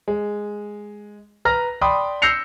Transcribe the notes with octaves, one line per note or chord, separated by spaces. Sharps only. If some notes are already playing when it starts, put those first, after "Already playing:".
G#3
B4 A#5 F6 A#6
D5 G5 B5 C6 D#6
E6 G6 A#6 C7 C#7 F7